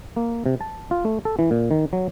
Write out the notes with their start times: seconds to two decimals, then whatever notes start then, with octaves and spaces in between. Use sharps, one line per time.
0.16 A#3
0.46 C3
0.61 A5
0.91 F4
1.05 A3
1.25 A4
1.39 E3
1.51 A#2
1.71 D#3
1.93 F#3